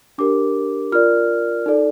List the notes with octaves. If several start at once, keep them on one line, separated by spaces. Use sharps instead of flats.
D4 G4 A#4 D6
F4 A#4 D5 F6
D#4 A4 D5